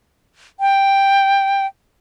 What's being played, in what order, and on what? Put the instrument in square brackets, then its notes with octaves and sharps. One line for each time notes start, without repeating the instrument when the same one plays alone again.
[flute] G5